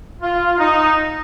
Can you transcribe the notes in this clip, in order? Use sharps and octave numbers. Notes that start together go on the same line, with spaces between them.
F4
D#4